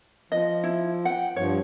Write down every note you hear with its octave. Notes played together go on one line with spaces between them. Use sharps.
F3 D#5
E4
F#5 G5
G2 F3 C#5